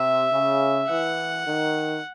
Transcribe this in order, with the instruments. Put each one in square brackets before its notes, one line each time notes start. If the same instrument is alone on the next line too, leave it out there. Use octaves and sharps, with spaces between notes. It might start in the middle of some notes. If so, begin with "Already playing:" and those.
Already playing: [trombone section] C3 [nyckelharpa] E5
[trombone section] C#3
[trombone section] E3 [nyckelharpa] F#5
[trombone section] D#3